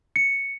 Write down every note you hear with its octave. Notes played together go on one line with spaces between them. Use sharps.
C#7